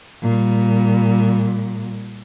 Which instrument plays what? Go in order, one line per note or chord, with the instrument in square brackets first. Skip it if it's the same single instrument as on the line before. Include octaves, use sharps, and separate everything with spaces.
[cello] A#2 G3